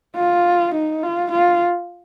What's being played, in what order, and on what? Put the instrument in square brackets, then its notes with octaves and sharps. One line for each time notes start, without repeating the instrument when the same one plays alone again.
[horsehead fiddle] F4
D#4
F4
F4